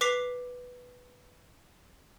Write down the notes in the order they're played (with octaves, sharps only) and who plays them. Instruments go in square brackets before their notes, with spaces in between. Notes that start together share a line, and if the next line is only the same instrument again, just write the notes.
[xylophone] B4 D6 B6 C7 F7